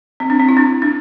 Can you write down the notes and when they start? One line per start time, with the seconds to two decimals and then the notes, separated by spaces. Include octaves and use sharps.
0.20 C4
0.30 D4
0.39 C4
0.49 E4
0.57 D4
0.82 D4